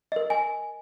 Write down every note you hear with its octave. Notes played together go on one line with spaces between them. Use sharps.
A#4 D#5
G#5